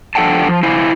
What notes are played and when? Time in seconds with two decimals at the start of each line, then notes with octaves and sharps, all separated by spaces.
0.15 F3 D4 A4 F#5 G5 A5
0.48 F3
0.63 E4 C5 F5 G#5